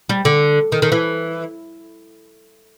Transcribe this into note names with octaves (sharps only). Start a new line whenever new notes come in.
G3
D3
D#3
D#3
E3